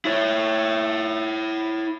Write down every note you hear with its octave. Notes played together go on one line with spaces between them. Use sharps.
E4 C#5